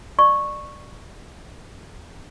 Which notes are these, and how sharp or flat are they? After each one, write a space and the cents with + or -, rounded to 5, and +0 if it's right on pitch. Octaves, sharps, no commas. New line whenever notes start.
D5 +25 C#6 -10